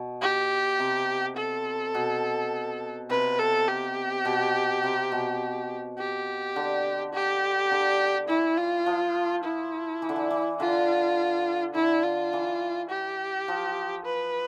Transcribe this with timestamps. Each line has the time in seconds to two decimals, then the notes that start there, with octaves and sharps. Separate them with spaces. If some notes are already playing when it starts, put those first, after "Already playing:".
Already playing: B2
0.22 G4
0.79 C3
1.37 A4
1.95 B2
3.10 C3 B4
3.39 A4
3.68 G4
4.25 B2
4.83 C3
5.12 B2
5.98 G4
6.56 D3
7.14 G4
7.71 D3
8.28 E3 E4
8.57 F4
8.86 F3
9.44 E4
10.02 E3
10.09 D3
10.16 E3
10.31 E3
10.60 D3 F4
11.74 D3 E4
12.03 F4
12.33 E3
12.91 G4
13.48 F3
14.05 B4